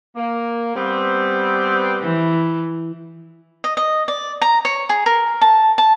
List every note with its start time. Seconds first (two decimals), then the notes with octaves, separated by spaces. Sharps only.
0.16 A#3
0.75 G3 B3 C4
2.01 E3
3.64 D#5
3.77 D#5
4.08 D5
4.42 A#5
4.65 C#5
4.89 G#4
5.06 A#4
5.41 A5
5.78 A5